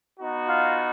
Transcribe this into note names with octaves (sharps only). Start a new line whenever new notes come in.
B3 D#4 F#4
F4 F5